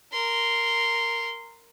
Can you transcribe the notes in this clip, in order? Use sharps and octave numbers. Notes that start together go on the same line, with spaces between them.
A#4 C6